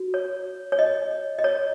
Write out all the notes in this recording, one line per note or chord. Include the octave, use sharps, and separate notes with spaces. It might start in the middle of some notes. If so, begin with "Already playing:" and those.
Already playing: F#4
C#5
C#5
D#5
D#5
C#5